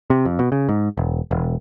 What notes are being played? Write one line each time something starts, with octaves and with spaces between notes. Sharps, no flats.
C3
F2
B2
C#3
G#2
E1
E1